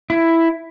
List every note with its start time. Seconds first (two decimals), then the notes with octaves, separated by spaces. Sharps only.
0.10 E4